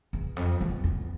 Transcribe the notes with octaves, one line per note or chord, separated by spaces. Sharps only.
E2
F2
E2
E2